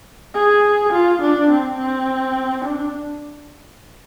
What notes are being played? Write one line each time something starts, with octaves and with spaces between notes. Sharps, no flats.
G#4
F4
D4
C4
C4
D4